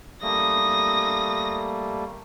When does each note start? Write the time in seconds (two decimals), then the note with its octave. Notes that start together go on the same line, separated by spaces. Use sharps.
0.22 G3 A3 A#3 D#6 A#6